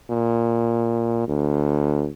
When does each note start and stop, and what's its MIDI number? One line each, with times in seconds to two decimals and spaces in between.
0.11 1.25 46
1.28 2.09 38